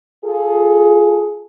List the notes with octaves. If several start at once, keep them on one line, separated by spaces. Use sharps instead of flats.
F4 G#4 A4